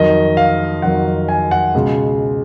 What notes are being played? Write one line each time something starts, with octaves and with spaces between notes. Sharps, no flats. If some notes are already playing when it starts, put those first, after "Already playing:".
Already playing: F2 D#3 F#3 D#5
F5
F2 D#3 F#3 F#5
G#5
F#5
C#2 B2 G#3